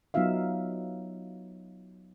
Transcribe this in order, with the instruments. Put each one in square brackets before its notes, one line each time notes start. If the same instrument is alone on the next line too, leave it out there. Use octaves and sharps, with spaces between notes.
[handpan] F#3 B3 D#4 F4 E5 F5